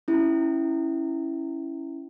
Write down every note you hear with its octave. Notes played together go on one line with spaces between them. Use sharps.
C#4 E4